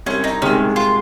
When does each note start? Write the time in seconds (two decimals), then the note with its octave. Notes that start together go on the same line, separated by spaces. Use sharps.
0.06 C2 C#4
0.24 D#4
0.42 C3 D#3 G#3 C#4
0.76 F4